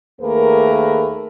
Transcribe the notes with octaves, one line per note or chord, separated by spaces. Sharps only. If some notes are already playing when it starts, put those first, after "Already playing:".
D#2 A3 A#3 G#4 A#4 B4